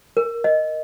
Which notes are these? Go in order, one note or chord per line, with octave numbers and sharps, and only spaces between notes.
A#4
D#5